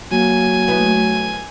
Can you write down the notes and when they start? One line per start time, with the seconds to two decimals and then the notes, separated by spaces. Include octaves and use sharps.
0.11 F#3 A#3 G#5
0.67 A3 B3 E4